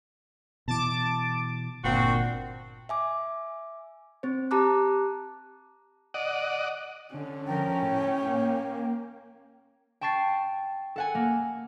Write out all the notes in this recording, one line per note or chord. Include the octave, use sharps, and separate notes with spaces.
B2 E3 A5 D6
G1 A#2 C4 D4 F#4
E5 G#5 D6
C4 C5
G4 A5 A#5 D6 F#6
D5 D#5 F#5
D3 C#4
F3 A#4 G5
A2 C#5
A#3
G5 A5 C#6 A6 C7
A4 F#5 G#5
A#3